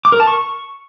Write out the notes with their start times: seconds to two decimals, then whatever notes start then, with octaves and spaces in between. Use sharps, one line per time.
0.05 D6
0.12 A#4
0.20 A5
0.27 C#6